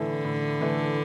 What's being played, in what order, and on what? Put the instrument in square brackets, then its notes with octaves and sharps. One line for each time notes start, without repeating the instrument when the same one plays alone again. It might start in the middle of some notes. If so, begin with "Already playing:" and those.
Already playing: [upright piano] A2 E3 A3 E4 [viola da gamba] D3
[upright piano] A2
E3 A3 E4